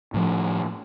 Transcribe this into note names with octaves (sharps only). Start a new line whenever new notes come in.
A2 F3